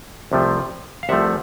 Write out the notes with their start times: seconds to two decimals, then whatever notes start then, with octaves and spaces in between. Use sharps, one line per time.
0.32 C2 C3 F3 A3
1.03 F5
1.09 C2 C3 F3 A3 E5 F#5